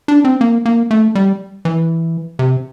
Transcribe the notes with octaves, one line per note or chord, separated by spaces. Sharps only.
D4
C4
A#3
A#3
A3
G3
E3
C3